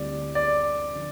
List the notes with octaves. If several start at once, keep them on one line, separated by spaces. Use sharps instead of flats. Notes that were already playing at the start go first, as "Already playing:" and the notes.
Already playing: D2 D3 G3 C4 E4 D5
D5
D3 F3